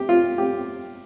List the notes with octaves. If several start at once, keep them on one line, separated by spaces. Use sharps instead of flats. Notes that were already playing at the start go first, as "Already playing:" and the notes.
Already playing: G4
F4
G4